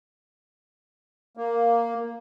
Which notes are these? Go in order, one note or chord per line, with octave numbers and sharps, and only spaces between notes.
A#3